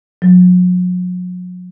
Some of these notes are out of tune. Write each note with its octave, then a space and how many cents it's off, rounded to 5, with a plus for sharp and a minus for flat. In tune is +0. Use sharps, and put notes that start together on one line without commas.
F#3 -40